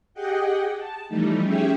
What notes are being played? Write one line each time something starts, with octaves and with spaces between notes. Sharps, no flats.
G4 G#4 D#5 F#5 G5
A5
E3 F3 G3 A3 D#4
C#4 G4 G#4 E5 G5